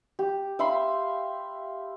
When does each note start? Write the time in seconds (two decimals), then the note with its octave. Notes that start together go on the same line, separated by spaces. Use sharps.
0.19 G4
0.59 E5 F5 B5 C6